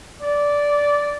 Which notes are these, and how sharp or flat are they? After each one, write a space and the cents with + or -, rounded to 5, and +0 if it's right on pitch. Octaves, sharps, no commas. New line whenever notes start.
D5 -10